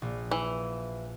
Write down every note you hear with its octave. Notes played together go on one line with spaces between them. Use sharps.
A#1
E3